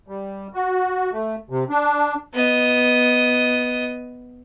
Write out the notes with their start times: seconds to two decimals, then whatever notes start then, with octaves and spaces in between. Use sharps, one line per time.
0.08 G3
0.54 F#4
1.13 A3
1.50 C3
1.70 D4
2.34 B3 D#5